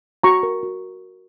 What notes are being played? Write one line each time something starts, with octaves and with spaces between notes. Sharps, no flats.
F#4 A#5 C#6
A#4
F#4